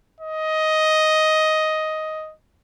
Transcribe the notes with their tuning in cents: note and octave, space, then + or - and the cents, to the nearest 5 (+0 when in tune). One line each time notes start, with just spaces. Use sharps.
D#5 +10